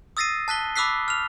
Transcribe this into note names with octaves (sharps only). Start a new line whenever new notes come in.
D#6 E6 A6 A#6 C7 D#7
A5 F#6 B6 G7
B5 D6 E6 F#6 B6 C7
F6 F7